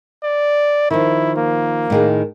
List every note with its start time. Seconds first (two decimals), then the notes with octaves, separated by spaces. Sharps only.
0.24 D5
0.91 D#3 F3 E4
1.37 A#3
1.90 A2 D#3 G#4